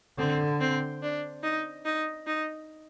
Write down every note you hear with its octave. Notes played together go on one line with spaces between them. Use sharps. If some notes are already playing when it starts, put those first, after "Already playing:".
D3 C4
C4
D4
D#4
D#4
D#4